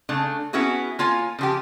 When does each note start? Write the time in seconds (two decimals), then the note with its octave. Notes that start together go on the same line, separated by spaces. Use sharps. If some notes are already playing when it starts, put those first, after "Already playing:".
0.09 C#3 A3 D4
0.53 B3 C#4 E4 F#4 G#4
0.99 A#3 F4 C#5 G#5
1.39 C#3 F3 G4